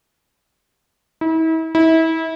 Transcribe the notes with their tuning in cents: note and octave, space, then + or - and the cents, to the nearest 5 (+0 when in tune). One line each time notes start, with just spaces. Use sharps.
E4 -40
E4 -30